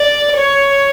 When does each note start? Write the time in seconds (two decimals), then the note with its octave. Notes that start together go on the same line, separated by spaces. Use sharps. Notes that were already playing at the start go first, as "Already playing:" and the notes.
Already playing: D5
0.36 C#5